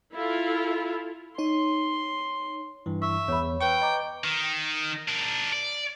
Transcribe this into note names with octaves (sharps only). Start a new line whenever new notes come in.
E4 F4 A4
D#4 C#5 C6
G2 E3
E5 C#6
E2 C#5 B5
B4 G5 C#6
D#5 A#5 D6
D#3
D4 A#4
D5